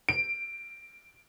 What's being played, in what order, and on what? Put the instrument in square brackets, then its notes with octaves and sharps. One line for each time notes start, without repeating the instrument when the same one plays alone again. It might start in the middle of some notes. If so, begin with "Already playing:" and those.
[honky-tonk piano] D7